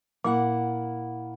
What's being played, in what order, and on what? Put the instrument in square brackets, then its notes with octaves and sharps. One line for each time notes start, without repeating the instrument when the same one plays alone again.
[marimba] A#2 [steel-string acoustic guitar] A#3 E4 F#5